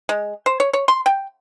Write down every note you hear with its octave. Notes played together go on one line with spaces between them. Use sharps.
G#3
C5
C#5
C#5
C6
G5